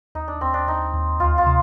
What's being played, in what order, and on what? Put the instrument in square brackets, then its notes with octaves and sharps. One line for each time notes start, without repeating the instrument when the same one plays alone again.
[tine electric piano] D#2 [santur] D#4
[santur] D4
[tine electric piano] D#2 [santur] C4
[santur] D4
[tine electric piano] D#2 [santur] D#4
[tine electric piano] D#2
[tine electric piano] D2 [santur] F4
[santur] F4
[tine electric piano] C3